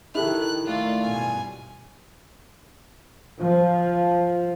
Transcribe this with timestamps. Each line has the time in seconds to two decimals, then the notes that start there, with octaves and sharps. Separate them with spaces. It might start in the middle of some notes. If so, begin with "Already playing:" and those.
0.15 D#3 E4 G4 A4 F#6
0.66 D#3 A3 F4 D5
1.03 G2 B2 G#5
3.41 F3